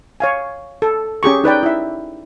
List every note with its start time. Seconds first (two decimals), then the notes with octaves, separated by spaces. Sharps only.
0.20 C#5 F5 G#5
0.82 A4
1.23 C#4 G4 G#4 C#6
1.44 D#4 B4 D5 G5
1.63 E4 E5